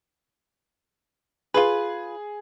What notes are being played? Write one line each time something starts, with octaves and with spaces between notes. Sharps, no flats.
F4 G#4 B4